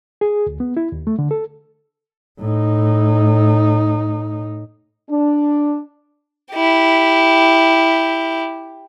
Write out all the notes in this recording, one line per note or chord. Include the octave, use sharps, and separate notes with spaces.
G#4
D2
B3
E4
D#2
A3
D3
A4
A2 D#4
D4
E4 G4